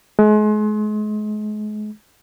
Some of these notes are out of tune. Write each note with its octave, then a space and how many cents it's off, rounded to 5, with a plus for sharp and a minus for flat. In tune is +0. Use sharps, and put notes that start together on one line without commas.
G#3 +35